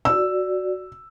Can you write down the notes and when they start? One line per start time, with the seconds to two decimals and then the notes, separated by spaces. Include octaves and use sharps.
0.05 F#4 D5 E6